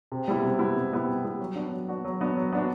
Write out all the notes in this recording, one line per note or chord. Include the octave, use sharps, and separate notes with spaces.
C3
G3 B3 E4
C3
G3 B3 E4
C3
G3 B3 E4
C3
G3 B3 E4
F#3
B3 D4 F#4
F#3
B3 D4 F#4
F#3
B3 D4 F#4
F#3
B3 D4 F#4